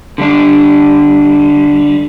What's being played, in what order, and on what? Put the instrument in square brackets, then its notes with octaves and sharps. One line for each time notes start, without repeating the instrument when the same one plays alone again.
[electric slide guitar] D3 G3 D4